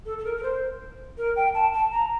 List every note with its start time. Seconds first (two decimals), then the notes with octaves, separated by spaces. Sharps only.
0.06 A4
0.18 A4
0.24 A#4
0.37 A#4
0.43 C5
1.18 A#4
1.36 G5
1.54 A5
1.74 A5
1.92 A#5